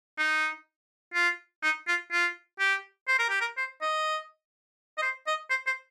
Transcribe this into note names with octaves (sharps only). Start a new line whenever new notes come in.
D#4
F4
D#4
F4
F4
G4
C5
A#4
G4
A#4
C5
D#5
D#5
C5
D#5
C5
C5